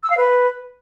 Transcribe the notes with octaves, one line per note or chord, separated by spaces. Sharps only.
E6
F5
B4